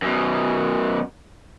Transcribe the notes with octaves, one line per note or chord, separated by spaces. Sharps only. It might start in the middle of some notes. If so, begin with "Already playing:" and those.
F#2 B2